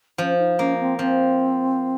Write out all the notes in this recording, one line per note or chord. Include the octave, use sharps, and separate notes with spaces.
F3 C#4
D#4
A#3 C#4
C4
F3 C4